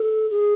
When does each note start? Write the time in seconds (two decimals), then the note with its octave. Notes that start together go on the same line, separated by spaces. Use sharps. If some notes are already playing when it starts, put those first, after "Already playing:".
Already playing: A4
0.31 G#4